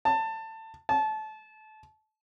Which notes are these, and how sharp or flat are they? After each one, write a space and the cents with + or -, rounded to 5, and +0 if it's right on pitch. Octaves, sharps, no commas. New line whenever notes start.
A5 +20
A5 -25